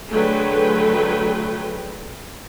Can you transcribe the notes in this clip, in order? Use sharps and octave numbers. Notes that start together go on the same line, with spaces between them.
D3 F#3 A3 G#4 B4 G5